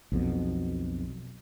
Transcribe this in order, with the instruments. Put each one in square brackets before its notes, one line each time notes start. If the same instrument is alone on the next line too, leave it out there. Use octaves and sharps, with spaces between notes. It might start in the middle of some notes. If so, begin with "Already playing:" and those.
[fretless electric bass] B1 F2 B2